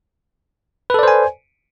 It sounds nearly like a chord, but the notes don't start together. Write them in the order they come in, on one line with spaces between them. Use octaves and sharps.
B4 A4 D5 C5 G#5